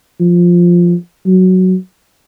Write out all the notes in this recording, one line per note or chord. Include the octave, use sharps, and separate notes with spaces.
F3
F#3